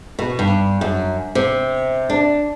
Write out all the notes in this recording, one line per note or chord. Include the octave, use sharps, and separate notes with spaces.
B2
G2
F#2
C3
D4